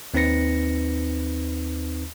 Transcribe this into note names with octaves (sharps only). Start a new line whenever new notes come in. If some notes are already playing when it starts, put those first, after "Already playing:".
D#2 C4 D#4 B4 A#6 C#7